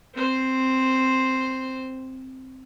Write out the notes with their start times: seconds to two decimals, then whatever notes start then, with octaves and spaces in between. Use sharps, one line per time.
0.14 C4 C5